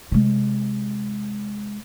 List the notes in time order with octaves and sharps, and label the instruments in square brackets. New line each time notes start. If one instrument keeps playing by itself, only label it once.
[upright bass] C3 G#3